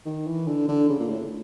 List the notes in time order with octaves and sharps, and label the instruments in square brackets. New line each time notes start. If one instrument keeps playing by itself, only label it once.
[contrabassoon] D#3
E3
D3
D3
C#3
A#2
A2